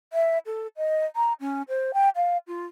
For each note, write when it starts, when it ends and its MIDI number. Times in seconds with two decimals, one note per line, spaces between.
0.13 0.38 76
0.46 0.67 69
0.77 1.05 75
1.16 1.33 82
1.40 1.62 61
1.68 1.92 72
1.94 2.09 79
2.16 2.37 77
2.47 2.66 65